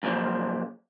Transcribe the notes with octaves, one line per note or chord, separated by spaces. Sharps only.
F#2 A#2 C#3 E3 F3